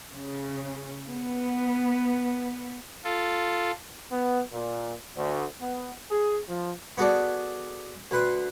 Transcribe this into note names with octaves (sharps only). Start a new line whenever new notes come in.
C#3
B3
F4 A4
B3
A#2
D2
B3
G#4
F3
B3 F#4 G#4 A4 D5
D2 B4 C6